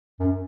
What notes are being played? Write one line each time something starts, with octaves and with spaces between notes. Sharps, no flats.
F#2